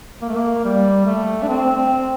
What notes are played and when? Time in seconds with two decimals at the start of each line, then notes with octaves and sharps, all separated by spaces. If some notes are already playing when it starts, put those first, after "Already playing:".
0.22 A#3
0.29 A3
0.35 A#3
0.64 G3
1.05 A3
1.43 D4
1.48 C4
1.75 C4